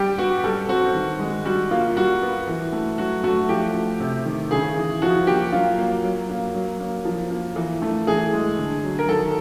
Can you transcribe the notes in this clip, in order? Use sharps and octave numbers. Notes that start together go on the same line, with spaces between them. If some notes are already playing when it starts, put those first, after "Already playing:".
Already playing: G3 G4
B3 F#4
G3 A4
C4 F#4
D#3
G#3
G3 F#4
A#3 F4
G3 F#4
B3
E3
A3
F#3 F#4
A3 F#4
F3 G4
A3
C3
D#3
C#3 G#4
E3
F3 F#4
A#3 G4
F#3 F4
A#3
F#3
A#3
F#3
A#3
F3
A#3
E3
A3
E3 G#4
G#3
D3
F#3
A#4
D#3 A4